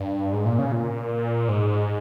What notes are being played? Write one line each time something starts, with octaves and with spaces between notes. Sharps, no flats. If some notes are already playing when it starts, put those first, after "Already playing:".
Already playing: G2
G#2
A#2
C#3
A#2
G#2